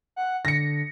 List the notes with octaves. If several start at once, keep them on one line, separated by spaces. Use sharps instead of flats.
F#5
D3 A#6 C#7